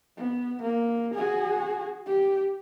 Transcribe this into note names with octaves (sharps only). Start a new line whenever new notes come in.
B3
A#3
F#4 G#4
G4